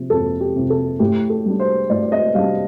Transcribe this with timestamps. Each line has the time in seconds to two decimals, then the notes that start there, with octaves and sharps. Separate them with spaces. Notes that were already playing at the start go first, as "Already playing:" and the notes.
Already playing: C3 F3
0.10 F2 A4
0.41 G4
0.55 C3 F3
0.70 A4
0.99 A2 G4
1.30 A4
1.46 G3 D4
1.60 C5
1.90 A2 D5
2.03 D5
2.12 D#5
2.35 G3 D4 F5